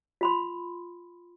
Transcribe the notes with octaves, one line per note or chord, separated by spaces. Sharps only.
F4 B5 C6